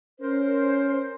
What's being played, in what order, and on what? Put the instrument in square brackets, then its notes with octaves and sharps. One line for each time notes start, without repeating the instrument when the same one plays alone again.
[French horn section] C#4 [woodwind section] A#4 C5